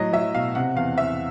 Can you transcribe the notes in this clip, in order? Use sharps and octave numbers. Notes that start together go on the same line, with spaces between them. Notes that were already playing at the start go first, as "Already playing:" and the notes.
Already playing: A2 F#3 D#5
F#3 E5
B2 F5
C3 F#5
E2 F5
E2 E5